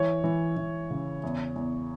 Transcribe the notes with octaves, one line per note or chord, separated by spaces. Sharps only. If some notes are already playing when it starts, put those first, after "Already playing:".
Already playing: E3 C#5
E3
E3
C#3
E2
E2